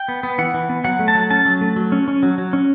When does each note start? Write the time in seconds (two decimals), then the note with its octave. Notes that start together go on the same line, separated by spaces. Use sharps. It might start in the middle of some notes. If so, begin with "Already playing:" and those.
Already playing: G5
0.08 B3
0.23 B3
0.38 E3 F#5
0.54 E3
0.69 B3
0.84 F#3 F#5
0.99 A3
1.08 A5
1.15 F#3
1.30 C#4 A5
1.45 F#3
1.61 A3
1.76 F#3
1.92 C#4
2.08 C#4
2.23 F#3
2.38 F#3
2.53 C#4